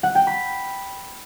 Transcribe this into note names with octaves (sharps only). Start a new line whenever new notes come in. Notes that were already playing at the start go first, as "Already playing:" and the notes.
F#5
G5
B5